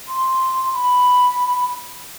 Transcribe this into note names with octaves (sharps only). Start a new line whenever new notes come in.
C6
B5